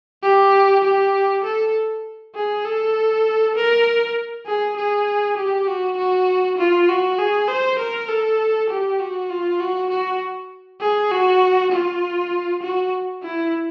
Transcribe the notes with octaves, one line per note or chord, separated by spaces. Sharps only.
G4
G4
A4
G#4
A4
A#4
G#4
G#4
G4
F#4
F#4
F4
F#4
G#4
C5
A#4
A4
G4
F#4
F4
F#4
F#4
G#4
F#4
F4
F#4
E4